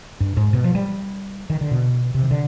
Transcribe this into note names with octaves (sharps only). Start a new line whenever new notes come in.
G2
G#2
B2
F3
G3
D#3
D3
B2
C3
D#3
D3